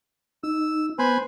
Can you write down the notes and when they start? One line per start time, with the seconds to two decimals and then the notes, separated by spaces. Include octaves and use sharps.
0.43 D#4 E6
0.99 B3 B4 C5 G#5